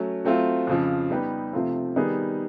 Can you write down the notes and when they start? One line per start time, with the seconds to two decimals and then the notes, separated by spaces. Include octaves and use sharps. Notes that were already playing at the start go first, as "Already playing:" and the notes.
Already playing: F#3 A3 C#4
0.25 F#3 A3 C4 F4
0.67 F2 C#3 F3
1.10 G3 B3 D#4 G4 B4
1.53 C3 F3 A3 C4 F4
1.96 D#3 G3 B3 D#4 G#4